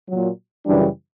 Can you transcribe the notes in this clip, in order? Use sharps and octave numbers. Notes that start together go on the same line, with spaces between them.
A#2 F#3
F#2 C#3 E3 G3 D4